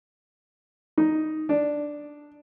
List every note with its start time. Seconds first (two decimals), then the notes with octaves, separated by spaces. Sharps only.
0.98 D#4
1.49 D4